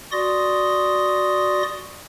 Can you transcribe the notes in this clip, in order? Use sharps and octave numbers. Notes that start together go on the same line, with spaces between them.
F#4 D5 C6 D#6 A#6